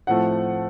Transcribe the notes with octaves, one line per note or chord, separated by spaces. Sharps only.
A2 F3 A3 C4 F#5